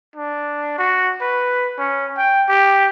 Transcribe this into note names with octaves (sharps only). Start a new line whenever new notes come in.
D4
F#4
B4
C#4
G5
G4